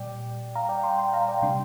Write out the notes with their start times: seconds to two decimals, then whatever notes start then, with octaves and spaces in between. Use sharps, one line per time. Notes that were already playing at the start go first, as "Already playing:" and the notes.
Already playing: A#2 G3 D5 G5
0.56 F5 A#5
0.69 D5 G5
0.84 G5 C6
0.98 G5 C6
1.13 F5 A#5
1.27 D5 G5
1.42 C3 G3 D4 G5 C6